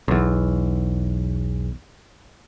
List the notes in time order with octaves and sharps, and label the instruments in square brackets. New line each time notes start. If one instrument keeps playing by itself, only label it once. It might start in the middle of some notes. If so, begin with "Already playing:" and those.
[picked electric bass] B1 E2